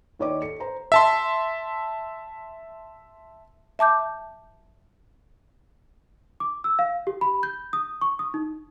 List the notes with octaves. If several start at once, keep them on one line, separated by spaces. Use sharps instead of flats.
D#2 D#3 C#5 D5 D6
A4 C#7
C5 A#5
E5 A5 C6
E5 A5 D6 G6
D6
E6
F5
G4
B5
G6
D#6
C#6
D#6
D#4